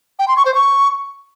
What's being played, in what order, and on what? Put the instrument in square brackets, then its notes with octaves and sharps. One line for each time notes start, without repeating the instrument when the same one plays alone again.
[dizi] G5
C6
C#6
C5
C#6